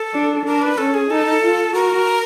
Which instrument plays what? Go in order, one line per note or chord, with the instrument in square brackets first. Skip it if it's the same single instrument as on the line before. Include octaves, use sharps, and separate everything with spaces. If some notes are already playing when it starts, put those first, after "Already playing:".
Already playing: [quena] A4
[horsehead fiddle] D4
[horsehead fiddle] D4 [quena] A#4
[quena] B4
[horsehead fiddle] C#4 [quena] A4
[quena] G#4
[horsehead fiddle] D#4 [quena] A4
[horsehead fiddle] F4
[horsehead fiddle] F#4 [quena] A#4